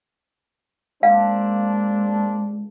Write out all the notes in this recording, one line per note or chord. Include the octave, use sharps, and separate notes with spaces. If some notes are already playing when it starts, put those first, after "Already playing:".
G#3 A#3 C4 D4 F5